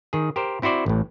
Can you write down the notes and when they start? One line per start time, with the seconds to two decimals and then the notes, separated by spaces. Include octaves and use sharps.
0.13 D#3 G#4
0.36 G4 A#4 C5
0.62 C4 E4 F#4 C5 D5
0.86 A1 A2